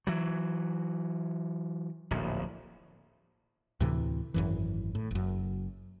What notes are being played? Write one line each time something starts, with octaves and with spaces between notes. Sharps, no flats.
E3 F#3
D1 A#1
D2 A2 C3 E3
G#1 F#2 E3
A2
F#1 F#2